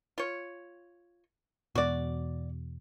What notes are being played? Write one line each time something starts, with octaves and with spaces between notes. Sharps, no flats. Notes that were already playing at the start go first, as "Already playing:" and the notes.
F4 C#5
E2 B2 F#4 D5